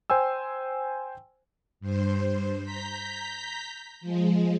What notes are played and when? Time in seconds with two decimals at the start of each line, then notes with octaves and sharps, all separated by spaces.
0.10 C5 G5 G#5 E6
1.80 G2 C5
2.63 A#5 G6 B6
4.01 F3 G#3